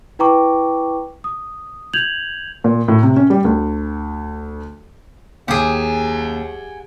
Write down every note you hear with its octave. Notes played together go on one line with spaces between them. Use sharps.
E4 B4 G5 A#5 C#6 D6
D#6
G6 G#6 F7 F#7
A#2
A2
C3
C#4
G3
D2
D#2 G4 G#4 F#5 G#5